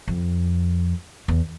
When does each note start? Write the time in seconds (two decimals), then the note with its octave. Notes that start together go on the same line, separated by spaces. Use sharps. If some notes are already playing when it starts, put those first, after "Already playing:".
0.08 F2
1.28 E2